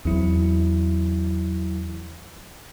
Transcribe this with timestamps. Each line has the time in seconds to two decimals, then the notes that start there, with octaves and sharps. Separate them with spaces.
0.05 E2 F#3 C4 E4